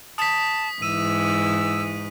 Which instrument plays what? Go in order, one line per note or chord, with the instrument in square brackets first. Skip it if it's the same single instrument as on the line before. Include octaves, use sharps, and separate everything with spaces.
[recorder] A5 [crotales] D#6 B6
[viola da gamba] G#2 [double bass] E3 [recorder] E6 [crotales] D#7